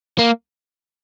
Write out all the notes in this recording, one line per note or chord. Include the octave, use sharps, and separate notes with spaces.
A#3